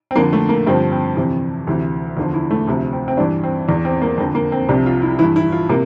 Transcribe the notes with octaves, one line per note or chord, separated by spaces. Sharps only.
C4
F2 D3 F3 A#3
A3
A#3
G2 D3 F3 C4
C4
F2 C3 E3
D2 C3 E3
E2 D3 F3
E4
A3
D2 C3 F3
C4
C4
G2 E3 D4
C4
E2 E3 D4
C4
A#3
F2 D3 F3 C4
A#3
C4
C2 C3 F3 D4
F4
E4
G2 E3 E4
E4
F4
C3 A#3